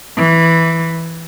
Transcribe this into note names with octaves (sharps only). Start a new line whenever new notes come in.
E3